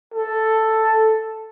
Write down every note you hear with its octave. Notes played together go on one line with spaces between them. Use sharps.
A4